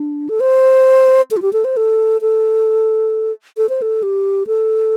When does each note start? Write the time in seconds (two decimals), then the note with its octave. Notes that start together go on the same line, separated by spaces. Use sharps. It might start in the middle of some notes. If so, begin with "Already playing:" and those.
Already playing: D4
0.29 A4
0.40 C5
1.31 A4
1.37 F4
1.42 G4
1.53 A4
1.65 C5
1.77 A4
2.21 A4
3.57 A4
3.69 C5
3.82 A4
4.03 G4
4.47 A4